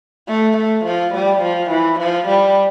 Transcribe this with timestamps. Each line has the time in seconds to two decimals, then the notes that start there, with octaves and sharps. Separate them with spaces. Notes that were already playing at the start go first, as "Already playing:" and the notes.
0.28 A3
0.57 A3
0.85 F3
1.14 G3
1.42 F3
1.70 E3
1.99 F3
2.28 G3